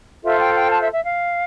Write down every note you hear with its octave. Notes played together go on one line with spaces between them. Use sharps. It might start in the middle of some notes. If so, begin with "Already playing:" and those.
F4 A4 C5 E5
G5
G5
A5
E5
E5
F5